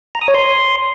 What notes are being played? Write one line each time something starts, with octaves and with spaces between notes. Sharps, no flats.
A#5
D#6
C#5
C6